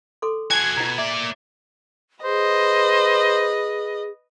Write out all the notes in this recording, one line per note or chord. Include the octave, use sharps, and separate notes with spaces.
A4 C6 D6
F#4 G#4 G#5 A5 G#6
B2 F4 A#5
A#3 D5 E5
G#4 B4 C5 D#5